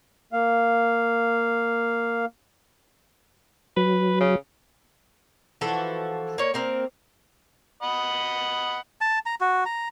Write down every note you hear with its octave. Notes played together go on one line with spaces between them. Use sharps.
A#3 F5
F#3 B4
C#3
E3 F3 F#4 A4
A#3 C#5
A#3 C4 A#4
D#5 F#5 B5
A5
A#5
F#4
A#5